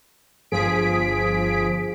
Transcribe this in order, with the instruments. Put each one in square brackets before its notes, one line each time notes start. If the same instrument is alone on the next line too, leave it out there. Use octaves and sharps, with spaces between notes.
[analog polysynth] G1 F3 G#4 B6 D7